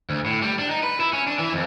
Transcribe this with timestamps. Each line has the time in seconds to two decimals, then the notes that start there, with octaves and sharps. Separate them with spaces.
0.10 D2
0.26 A2
0.42 G3
0.59 D4
0.70 D#4
0.83 B4
1.00 E4
1.13 C#4
1.27 D4
1.39 E3
1.53 F2